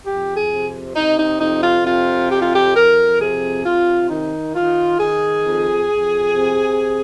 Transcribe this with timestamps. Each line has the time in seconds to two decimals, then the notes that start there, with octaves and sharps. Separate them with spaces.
0.06 F2 G4
0.36 G#4
0.50 C3
0.95 C3 D#4
1.18 D#4
1.40 F2 D#4
1.63 F4
1.85 C3 F4
2.30 F2 G4
2.42 F4
2.54 G4
2.75 F2 A#4
3.20 C3 G#4
3.65 C3 F4
4.10 D#3 D#4
4.54 D#3 F4
4.99 D#3 G#4
5.44 F2
5.89 F2
6.34 C3